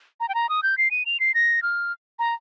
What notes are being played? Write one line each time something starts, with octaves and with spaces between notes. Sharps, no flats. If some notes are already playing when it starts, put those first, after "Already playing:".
A#5
G5
A#5
D#6
G6
C7
D#7
F7
C7
A#6
F6
A#5